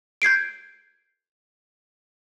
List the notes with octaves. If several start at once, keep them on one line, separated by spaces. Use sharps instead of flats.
G6 G#6 C7 D7